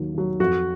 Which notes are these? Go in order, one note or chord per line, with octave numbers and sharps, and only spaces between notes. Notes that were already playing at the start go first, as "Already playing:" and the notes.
Already playing: D#2 D#3 F#3
D#3 F#3
F2 F#4